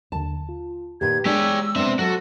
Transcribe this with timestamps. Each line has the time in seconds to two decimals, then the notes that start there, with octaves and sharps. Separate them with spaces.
0.12 D#2 D3 A5
0.49 F4
1.01 A#2 D#3 G4 B4 G#6
1.25 G#3 B3 D4 G4 G#4 C#5 E6
1.76 B3 C4 D4 E5
1.99 F#3 F#4 A4 F#6